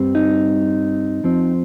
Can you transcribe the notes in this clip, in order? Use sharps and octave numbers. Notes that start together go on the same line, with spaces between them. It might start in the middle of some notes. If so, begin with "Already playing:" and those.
Already playing: G2 G3 C4
D#4
F2 F3 C4